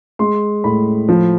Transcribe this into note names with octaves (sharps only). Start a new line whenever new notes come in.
G#3 C6
A2 B5
F3